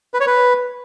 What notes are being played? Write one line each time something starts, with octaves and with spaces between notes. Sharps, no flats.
B4
C#5
B4